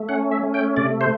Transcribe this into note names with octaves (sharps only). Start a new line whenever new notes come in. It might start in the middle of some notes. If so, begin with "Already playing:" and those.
Already playing: A3
C#4 F#5
E5
A3
G5
C3 D5
C5